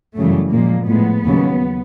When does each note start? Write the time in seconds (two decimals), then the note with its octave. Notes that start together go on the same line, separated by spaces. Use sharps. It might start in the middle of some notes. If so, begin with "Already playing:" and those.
0.17 F#2 C#3 E3 G3 A3
0.53 A#2 F3 G#3 A#3
0.88 A2 F3 G#3 B3
1.25 D#2 C#3 F#3